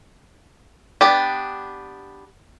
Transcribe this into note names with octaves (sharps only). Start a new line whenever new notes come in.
B3 D4 G4